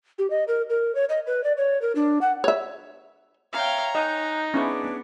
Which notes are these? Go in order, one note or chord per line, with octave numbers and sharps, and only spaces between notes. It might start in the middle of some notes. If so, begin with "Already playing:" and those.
G4
D#5
A#4
A#4
C#5
D#5
B4
D5
C#5
A#4
D4
F#5
C#5 E5
C#5 E5 F5 G5 A#5 G#6
D#4 D#5 G#5 F#6 G6
B3 C#4 D4 E4 G#4 B4 C#6